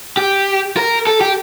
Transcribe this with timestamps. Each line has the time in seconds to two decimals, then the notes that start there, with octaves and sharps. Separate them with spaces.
0.17 G4
0.77 A#4
1.07 A4
1.21 G4